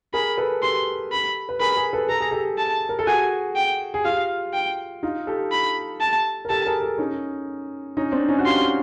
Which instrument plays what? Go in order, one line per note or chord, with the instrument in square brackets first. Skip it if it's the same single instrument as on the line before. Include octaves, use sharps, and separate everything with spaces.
[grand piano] G#4 A#4 [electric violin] B5
[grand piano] A4 B4
[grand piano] G4 A4 [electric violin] C6
[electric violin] B5
[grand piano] B4
[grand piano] G#4 A#4 [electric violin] B5
[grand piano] G#4 A#4
A4 B4
[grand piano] A4 [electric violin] A#5
[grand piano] G#4
G4 A4
[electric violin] A5
[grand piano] A#4
A4
[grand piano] F#4 G#4 [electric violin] G#5
[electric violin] G5
[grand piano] G#4
[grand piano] F4 G4 [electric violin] F5
[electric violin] G5
[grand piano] D#4 F4
G4 A4
[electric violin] B5
A5
[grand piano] A#4
[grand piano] G4 A4 [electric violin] A5
[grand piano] G#4 A#4
G4 A4
C#4 D#4
C#4 D#4
C4 D4
C#4 D#4
F#4
[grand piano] F4 G4 [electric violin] C6